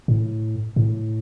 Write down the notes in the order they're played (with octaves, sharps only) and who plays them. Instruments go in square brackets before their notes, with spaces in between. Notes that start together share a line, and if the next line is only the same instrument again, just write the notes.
[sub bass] A2
A2